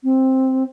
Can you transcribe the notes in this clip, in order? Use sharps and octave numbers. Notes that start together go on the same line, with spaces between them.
C4